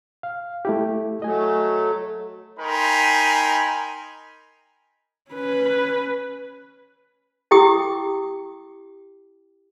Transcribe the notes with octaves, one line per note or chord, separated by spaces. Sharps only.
F5
A3 E4 G4
F#3 A3 D#5 G#5
D#4 A#4 G5 G#5 B5 C6
C#4 B4
E4 G4 G5 D6 D#6